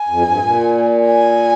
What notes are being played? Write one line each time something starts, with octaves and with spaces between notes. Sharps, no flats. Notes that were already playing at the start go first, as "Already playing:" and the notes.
Already playing: G#5
F2
G2
A#2
G#5